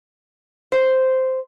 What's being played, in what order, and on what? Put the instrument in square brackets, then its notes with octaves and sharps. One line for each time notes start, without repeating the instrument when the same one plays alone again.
[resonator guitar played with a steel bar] C5